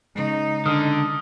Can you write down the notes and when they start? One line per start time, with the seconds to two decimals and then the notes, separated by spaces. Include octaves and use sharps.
0.15 C#3 G#3 D#4
0.66 D3 D#6 F6